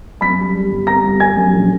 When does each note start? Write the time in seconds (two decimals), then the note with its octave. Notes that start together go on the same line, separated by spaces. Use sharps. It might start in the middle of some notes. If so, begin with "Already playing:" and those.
0.21 F#2 B5 B6
0.39 G3
0.54 G3
0.70 G1
0.87 G3 A#5 A#6
1.04 G1
1.20 G3 G#5 G#6
1.37 F#2
1.53 A#1